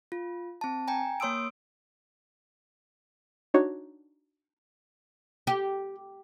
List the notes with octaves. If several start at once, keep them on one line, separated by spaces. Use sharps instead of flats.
F4
C4 A5
G5 G#5 A#5
A#3 C#5 C6 D#6 E6 D7
D4 D#4 F#4 C#5
G4